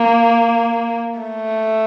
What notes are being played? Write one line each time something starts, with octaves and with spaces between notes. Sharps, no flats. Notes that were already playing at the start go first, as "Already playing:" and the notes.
Already playing: A#3
A3